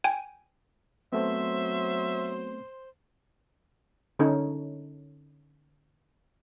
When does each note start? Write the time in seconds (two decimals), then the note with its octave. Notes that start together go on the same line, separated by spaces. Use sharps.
0.04 G5 G#5
1.13 F#3 A3 B3 C4 C5 E5 C6
4.19 D3 C#4 D#4 A4 C#5